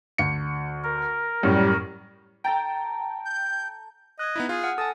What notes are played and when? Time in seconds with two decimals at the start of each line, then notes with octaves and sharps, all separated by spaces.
0.18 D2 C#7
0.84 A#4
1.43 F#2 A2 G3
2.44 A4 G5 A5 A#5
3.25 G6
4.19 D#5 F#6 G#6
4.36 B3 D#4 E4
4.49 F4 G#4
4.62 F#5 F6
4.78 A4 G#5 A5 D#6